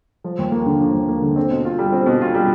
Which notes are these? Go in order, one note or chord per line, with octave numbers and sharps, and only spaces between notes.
F3
D#2
A#3
D3
F3
D#2
A#3
D3
C4
B2
F4
G3
C4
B2
F4
G3